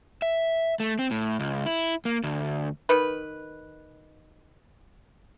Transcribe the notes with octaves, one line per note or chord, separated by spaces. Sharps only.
E5
A3
C4
A2
C#2
E4
A#3
D2
D#3 B4